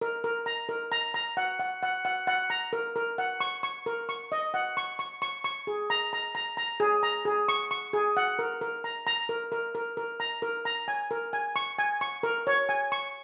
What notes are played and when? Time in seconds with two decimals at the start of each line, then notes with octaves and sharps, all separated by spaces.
0.01 A#4
0.24 A#4
0.46 A#5
0.69 A#4
0.92 A#5
1.14 A#5
1.37 F#5
1.60 F#5
1.83 F#5
2.05 F#5
2.27 F#5
2.50 A#5
2.73 A#4
2.96 A#4
3.18 F#5
3.40 C#6
3.63 C#6
3.86 A#4
4.09 C#6
4.32 D#5
4.54 F#5
4.77 C#6
4.99 C#6
5.22 C#6
5.44 C#6
5.67 G#4
5.90 A#5
6.13 A#5
6.35 A#5
6.57 A#5
6.80 G#4
7.03 A#5
7.25 G#4
7.48 C#6
7.71 C#6
7.93 G#4
8.17 F#5
8.39 A#4
8.61 A#4
8.84 A#5
9.07 A#5
9.29 A#4
9.52 A#4
9.75 A#4
9.97 A#4
10.20 A#5
10.42 A#4
10.65 A#5
10.88 G#5
11.11 A#4
11.33 G#5
11.56 C#6
11.78 G#5
12.01 C#6
12.23 A#4
12.47 C#5
12.69 G#5
12.92 C#6